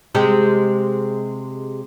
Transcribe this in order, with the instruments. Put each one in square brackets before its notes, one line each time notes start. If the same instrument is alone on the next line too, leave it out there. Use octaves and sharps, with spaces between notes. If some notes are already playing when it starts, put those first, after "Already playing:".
[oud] C3 G#3 G4